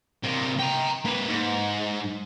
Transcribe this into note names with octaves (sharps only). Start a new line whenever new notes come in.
C3 A#3
G5 A#5
A#3 B4
G#2